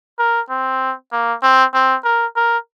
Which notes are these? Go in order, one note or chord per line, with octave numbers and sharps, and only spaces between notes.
A#4
C4
A#3
C4
C4
A#4
A#4